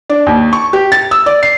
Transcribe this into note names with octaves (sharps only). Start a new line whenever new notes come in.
D4
D#2
C#6
G4
A6
E6
D5
C7